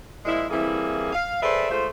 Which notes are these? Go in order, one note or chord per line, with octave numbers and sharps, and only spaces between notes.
A#2 F3 G#3 E4
E3 G3 A#3 C4 E4 G#4
F5
G#4 A4 B4 C5 D5 E5
G#3 A3 F4 G#4 C5